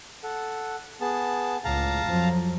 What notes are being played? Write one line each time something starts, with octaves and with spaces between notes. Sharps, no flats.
A4 F#5
B3 G#4 A5
C#2 A2 F5 A5 A#5
F2 F3 F#3